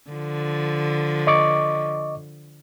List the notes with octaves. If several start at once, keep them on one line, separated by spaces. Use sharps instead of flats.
D3 F3
D#5 C#6 D6